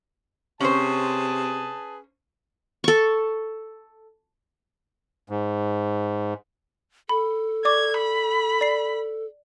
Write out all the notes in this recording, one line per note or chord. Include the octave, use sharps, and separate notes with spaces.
C3 C#4 G#4 B4 C5 A5
A4 C#6
G#2
A4 B5
D5 C#6 D6 G#6
B5
D5 C7